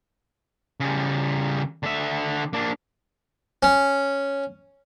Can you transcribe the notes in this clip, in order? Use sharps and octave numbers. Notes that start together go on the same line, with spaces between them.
C#3 G3
D3 E5
A#3 D4
C#4